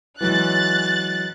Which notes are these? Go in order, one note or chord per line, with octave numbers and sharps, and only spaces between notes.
E3 F#3 G#3 F#6 A6